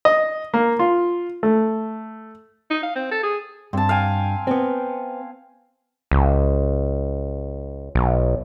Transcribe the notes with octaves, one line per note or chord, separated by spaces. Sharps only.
D#5
A#3
F4
A3
D#4
F5
C4
A4
G#4
G2 C4 A5
F5 G5 G#5
B3 C4
C#2
B1